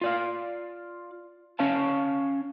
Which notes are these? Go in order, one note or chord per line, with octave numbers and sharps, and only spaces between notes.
F4 D5 F5
C#4 C#5 F5 A5